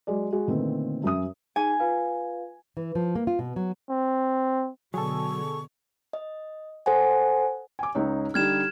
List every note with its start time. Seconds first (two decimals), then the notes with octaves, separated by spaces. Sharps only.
0.07 F#3 G#3 D5
0.32 G#3 F#4 G#4
0.47 A#2 D3 D#3 A3 B3 C4
1.04 F#2 C#4 E5 D#6
1.56 D#4 G#4 G#5
1.79 F4 B4 F5
2.77 E3
2.95 F3
3.15 A#3
3.27 F4
3.39 B2
3.56 F#3
3.89 C4
4.94 B2 D3 F#3 G#4 A4 C#6
6.13 D#5
6.86 A4 C5 F#5 G#5
7.79 G#5 D6
7.95 C#2 D#4 C#5
8.34 D3 G3 D#4 F6 G#6 E7